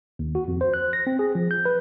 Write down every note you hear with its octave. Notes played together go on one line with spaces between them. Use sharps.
D#2
F#4
F2
C5
F#6
A#6
C4
G#4
F3
G6
B4